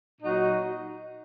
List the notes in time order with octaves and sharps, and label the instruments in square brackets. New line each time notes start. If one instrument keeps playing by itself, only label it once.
[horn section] A#2 F#3 D#4 F#4